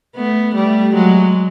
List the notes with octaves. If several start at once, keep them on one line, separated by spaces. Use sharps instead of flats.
A3 B3
G3 A3
F#3 G#3